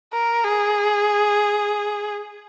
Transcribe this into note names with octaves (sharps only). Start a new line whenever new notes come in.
A#4
G#4